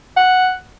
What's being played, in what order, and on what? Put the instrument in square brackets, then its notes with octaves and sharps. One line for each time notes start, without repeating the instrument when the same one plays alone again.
[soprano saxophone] F#5